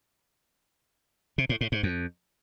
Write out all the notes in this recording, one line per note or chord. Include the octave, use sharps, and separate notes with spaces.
C3
A2
A2
G#2
F2